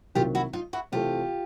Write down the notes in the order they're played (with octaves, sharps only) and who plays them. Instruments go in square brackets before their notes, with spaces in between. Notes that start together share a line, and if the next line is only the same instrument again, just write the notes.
[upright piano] C2 C3 D#3 F#3 A#3 [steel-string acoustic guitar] F4 G4
[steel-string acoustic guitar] E4 F#4
D#4 F4
E4 F#4
[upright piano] C3 E3 A3 C4 [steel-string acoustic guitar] F4 G4